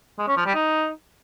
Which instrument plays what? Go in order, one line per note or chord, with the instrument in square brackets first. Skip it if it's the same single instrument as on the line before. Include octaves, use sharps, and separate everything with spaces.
[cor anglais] G#3
C#4
F3
G3
D#4